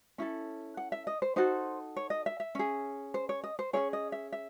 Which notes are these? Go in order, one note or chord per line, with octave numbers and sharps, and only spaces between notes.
C#4 E4 A4
F#5
E5
D#5
C5
D#4 F#4 A4 C5
C#5
D#5
E5
E5
C#4 G#4
C5
C#5
D#5
C5
C#4 E4 G#4 C#5
D#5
E5
E5